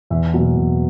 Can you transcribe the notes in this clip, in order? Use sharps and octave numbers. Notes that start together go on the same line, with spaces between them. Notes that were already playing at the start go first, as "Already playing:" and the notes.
E2 E5
B2 F#3 A#3
E2